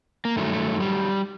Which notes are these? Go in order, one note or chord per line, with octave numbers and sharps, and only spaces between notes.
A#3
G2 D#3 F#3 A3
G3